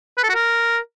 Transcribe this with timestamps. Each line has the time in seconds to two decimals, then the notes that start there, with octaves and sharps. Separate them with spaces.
0.18 B4
0.23 A4
0.29 F#4
0.35 A#4